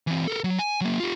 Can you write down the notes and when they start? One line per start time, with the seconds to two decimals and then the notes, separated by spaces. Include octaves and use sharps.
0.07 E3 C4
0.27 A4 A#4
0.44 F#3
0.59 G#5
0.81 F#3 A#3
1.00 F4 G4